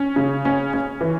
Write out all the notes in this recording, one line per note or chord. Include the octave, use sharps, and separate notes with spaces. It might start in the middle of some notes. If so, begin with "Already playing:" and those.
Already playing: C#4
C#3
C#4
C#4
E3